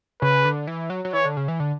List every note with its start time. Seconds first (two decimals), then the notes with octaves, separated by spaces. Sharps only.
0.22 C#3 B4
0.45 D3
0.67 E3
0.90 F#3
1.05 F#3
1.13 E3 C#5
1.25 D3
1.37 C#3
1.48 E3
1.60 D3